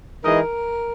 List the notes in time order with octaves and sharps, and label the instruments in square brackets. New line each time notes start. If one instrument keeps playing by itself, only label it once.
[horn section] E3 G#3 D#4 G#4 D#5 [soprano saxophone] A#4